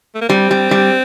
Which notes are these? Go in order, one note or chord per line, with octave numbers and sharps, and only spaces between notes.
A3
A#3
G3 C4
G3
G3